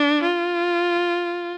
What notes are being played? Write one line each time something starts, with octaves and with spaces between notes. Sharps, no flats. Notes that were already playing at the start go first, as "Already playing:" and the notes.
Already playing: D4
F4